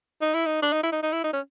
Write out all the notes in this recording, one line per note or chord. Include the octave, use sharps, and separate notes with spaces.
D#4
E4
D#4
D4
D#4
E4
D#4
D#4
E4
D#4
C#4